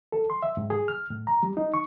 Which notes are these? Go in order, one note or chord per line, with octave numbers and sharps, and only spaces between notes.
A4
C6
E5
G#2
G#4
F6
A2
A#5
G3
D#4
C#6